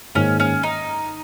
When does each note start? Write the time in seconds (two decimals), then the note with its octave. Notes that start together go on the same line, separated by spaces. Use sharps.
0.15 G#2 D#3 A#3 C#4
0.40 C#4
0.63 D#4